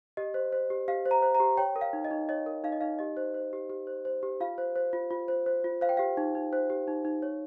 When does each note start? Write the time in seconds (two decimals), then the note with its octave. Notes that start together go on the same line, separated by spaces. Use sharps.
0.17 G4 D#5
0.34 C5
0.52 C5
0.70 G4
0.88 G4 F5
1.06 C5
1.11 A#5
1.23 C5
1.35 A#5
1.40 G4
1.57 C#5 G5
1.76 A#4
1.81 F5
1.93 D#4
2.05 D#5
2.11 D#4
2.29 C#5 D#5
2.46 A#4
2.64 D#4 F5
2.72 D#5
2.81 D#4 F5
2.99 G4 D#5
3.17 C5
3.34 C5
3.53 G4
3.70 G4
3.87 C5
4.05 C5
4.23 G4
4.40 F4 F5
4.58 C5
4.76 C5
4.93 F4
5.11 F4
5.28 C5
5.46 C5
5.64 F4
5.81 C5 F5
5.89 G5
5.97 G4 F5
6.17 D#4
6.35 D#4
6.53 C5
6.70 G4
6.88 D#4
7.05 D#4
7.22 C#5